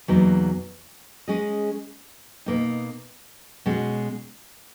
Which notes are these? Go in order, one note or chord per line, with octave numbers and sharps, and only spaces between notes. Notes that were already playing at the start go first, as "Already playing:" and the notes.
E2 B2 F#3 A#3 D#4
G#3 C#4 G#4 D#5
B2 A#3 D#4
B2 G#3 C#4 F#4